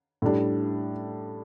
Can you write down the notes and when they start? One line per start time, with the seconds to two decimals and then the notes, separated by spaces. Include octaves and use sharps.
0.22 A2 G3 D4